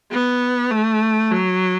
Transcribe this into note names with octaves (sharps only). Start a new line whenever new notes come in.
B3
A3
F#3